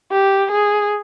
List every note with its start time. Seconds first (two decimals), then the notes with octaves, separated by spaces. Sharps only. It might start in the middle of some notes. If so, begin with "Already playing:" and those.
0.12 G4
0.51 G#4